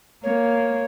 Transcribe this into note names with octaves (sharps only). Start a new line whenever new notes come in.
A#3 C#5